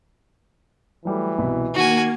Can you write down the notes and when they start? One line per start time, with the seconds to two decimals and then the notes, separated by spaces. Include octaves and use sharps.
1.05 E3 F#3 G3 A3
1.38 C2 B2 B5
1.74 D#3 A#3 F#4 G#5 C#6 G#6